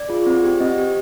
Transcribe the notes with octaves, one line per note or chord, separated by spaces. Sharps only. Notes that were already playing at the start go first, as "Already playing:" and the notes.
Already playing: D5
F4 G#4
C4
G4
C4 D#5
G4